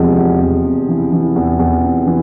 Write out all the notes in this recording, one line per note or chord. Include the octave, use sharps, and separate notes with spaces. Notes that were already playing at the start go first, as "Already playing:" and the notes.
Already playing: E2 C3 F3 G#3
E2
E2
C3
E3
E3
E2
E2
C3
E3